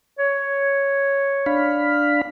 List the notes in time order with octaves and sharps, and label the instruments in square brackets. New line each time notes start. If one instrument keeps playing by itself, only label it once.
[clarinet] C#5
[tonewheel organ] D4 F5 B5